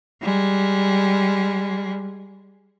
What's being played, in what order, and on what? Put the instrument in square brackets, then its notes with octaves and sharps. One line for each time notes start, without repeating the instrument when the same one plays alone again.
[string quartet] G3 G#3